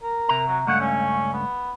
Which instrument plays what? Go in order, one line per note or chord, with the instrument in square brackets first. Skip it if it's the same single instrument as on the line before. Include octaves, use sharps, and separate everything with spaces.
[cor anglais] A#4
[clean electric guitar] C3 A#5
[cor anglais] F#3
[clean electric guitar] C#2 G2 A3 [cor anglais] F#5
[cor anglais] C#4
B3